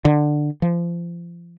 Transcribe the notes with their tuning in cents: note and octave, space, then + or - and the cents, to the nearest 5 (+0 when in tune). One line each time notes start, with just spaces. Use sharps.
D3 +15
F3 -30